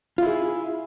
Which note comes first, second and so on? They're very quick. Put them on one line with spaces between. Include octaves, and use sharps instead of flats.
F4 E4 G#4